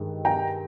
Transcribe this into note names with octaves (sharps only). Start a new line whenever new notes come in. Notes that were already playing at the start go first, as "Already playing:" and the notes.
Already playing: G2 D#3 G#3
G5 A#5